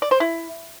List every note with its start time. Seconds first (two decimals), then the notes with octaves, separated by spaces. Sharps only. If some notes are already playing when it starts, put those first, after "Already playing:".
0.02 D5
0.11 C5
0.20 E4